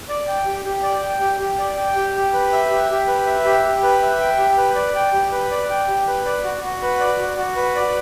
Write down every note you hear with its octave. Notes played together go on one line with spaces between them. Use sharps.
D5
G5
G4
G4
D5
G5
G4
G4
D5
G5
G4
G4
B4
E5
G4
G4
B4
E5
G4
G4
B4
E5
G5
G4
B4
D5
G5
G4
B4
D5
G5
G4
B4
D5
F#4
F#4
B4
D5
F#4
F#4
B4
D5